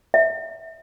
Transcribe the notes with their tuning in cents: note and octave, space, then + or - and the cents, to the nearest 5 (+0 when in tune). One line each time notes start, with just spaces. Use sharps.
E5 -20